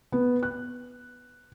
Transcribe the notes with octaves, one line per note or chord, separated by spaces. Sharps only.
B3
F#6